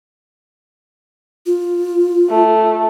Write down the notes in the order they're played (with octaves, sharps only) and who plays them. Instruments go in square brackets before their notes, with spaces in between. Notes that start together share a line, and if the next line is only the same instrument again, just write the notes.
[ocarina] F4
[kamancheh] A3